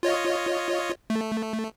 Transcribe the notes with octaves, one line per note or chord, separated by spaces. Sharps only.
F4 C#5 D#5
A3